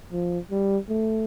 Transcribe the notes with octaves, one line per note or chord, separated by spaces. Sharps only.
F3
G3
A3